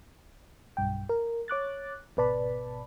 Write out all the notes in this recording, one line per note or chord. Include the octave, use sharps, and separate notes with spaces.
B1 G2 G5
A#4
C#5 D6 F#6 A6
G#1 B2 B4 D5 A5 B5